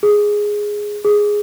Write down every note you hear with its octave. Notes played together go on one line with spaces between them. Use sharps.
G#4
G#4